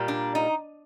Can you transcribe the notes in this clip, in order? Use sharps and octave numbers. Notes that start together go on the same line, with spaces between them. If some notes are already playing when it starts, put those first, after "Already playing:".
Already playing: A#2 G3 A#3
D4
D#4